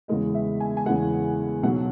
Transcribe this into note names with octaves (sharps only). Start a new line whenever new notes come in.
E2 C#3 E3 G#3 D#5
E5
G#5
G#5
E2 C#3 E3 G#3 F#5
B1 B2 F#3 F#5